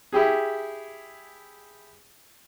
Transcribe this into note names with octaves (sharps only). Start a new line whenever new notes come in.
E4 G4 G#4